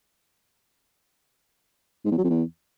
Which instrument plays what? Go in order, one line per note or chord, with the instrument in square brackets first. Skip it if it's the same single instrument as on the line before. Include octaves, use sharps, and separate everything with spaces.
[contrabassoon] G#2
E2
F#3
F2
E2